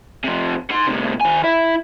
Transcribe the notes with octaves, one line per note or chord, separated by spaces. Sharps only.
C3 F3
D#4 C6
A2 C3
D#3 G#5
E4 E5